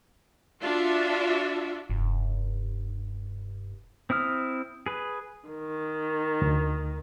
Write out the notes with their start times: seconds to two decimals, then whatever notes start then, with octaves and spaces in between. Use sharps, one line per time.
0.64 D4 F4 F#4 E5
1.90 F1 G2
4.10 C4 E4 D#6 F6
4.86 G#4 B4
5.49 D#3
6.42 D2